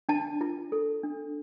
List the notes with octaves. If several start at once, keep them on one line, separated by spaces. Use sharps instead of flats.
D4 A5
F4
A4
D4